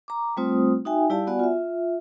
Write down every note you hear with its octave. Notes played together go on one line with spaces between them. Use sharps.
A#5 D6
G3 A3 C4 F4 C5 D#6
D#4 F#4 E5 G5 G#5
G3 E4 G4 D5 F5 A5
B3 F#4 D5 F#5 G#5
F4 E5